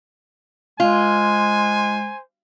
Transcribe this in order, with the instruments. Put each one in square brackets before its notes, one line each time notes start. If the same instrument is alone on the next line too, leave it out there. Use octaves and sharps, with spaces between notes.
[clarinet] G#3 [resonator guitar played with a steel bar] F4 [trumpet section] C5 G#5